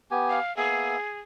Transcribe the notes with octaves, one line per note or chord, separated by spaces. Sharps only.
B3 G4 G#5
F5
A#3 B3 G#4 E5